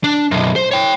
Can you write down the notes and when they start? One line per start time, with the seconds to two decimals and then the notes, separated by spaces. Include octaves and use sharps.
0.04 D4
0.31 B1 F#2
0.56 C5
0.71 C#5 G5